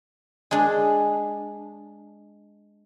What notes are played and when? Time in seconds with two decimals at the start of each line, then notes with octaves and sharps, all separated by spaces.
0.51 G#3 D4